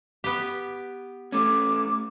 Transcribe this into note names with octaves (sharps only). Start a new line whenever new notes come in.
B3 G4
A3 C#4 D6